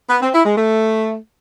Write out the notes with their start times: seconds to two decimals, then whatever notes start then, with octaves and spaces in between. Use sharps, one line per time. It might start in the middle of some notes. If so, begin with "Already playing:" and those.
0.09 B3
0.21 C4
0.33 E4
0.45 G#3
0.57 A3